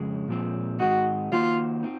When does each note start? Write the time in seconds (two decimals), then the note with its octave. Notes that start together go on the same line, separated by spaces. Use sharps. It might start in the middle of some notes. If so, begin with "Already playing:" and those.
Already playing: F2 C#3 G#3
0.28 A#2 F3 G#3 C4
0.79 G#2 D#3 G#3 C4 D#4 F#4
1.32 D#3 A#3 D#4 F4 F#4 C5
1.83 C4 D#4